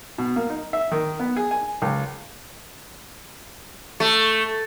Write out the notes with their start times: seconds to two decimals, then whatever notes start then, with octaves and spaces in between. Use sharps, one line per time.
0.18 B2
0.36 A#3
0.50 D#4
0.73 E5
0.91 D#3
1.20 B3
1.37 G#4
1.51 G#5
1.82 C#2
4.00 A3